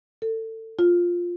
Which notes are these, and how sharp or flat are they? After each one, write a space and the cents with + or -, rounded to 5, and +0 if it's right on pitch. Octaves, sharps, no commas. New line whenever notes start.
A4 +25
F4 +5